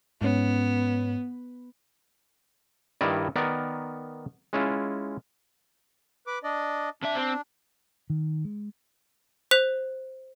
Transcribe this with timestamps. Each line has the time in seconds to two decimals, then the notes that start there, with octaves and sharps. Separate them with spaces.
0.22 G#2 B3 C#4
3.01 G2 D#3 E4 D5 D#5
3.36 D#3 B3 A#4 D5
4.53 G#3 C#4 E4 F4
6.27 B4 D6
6.44 D4 D5 D#5
7.02 C3 D4 E5
7.15 C4
8.10 D#3
8.45 G#3
9.51 C5 F#6 B6 F7